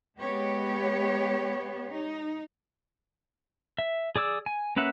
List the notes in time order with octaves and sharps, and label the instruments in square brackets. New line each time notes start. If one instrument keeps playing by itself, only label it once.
[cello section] G#3 B3 G4 C#5
D#4
[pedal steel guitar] E5
G#4 D5 D6 E6
G#5
A#3 C#4 B4 E5 F#5